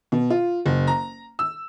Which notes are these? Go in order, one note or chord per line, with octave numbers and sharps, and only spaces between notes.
B2
F4
F#1
A#5
E6